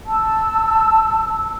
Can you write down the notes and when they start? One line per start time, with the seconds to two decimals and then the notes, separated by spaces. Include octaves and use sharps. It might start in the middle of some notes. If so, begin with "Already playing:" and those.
0.07 A5 E6